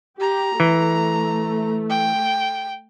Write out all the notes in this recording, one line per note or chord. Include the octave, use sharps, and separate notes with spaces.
G4 A#5
E3 A3
G5